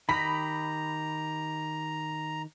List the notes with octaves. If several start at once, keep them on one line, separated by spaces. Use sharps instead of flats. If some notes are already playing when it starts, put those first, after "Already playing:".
D#3 G4 D#5 A#5 B5 A#6 B6